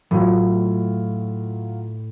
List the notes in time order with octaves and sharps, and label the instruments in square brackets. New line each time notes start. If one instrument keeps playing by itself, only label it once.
[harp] A2 [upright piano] F#3 F4